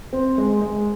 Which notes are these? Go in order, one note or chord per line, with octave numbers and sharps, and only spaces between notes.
C4
G#3
G#3